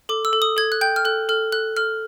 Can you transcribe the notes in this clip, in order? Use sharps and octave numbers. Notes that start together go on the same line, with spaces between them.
A4 D6
E6
A4
D#6
A4 G#6
F#6
G5 G6
F6
A4 F#6
A4 F6
A4 F#6
A4 F6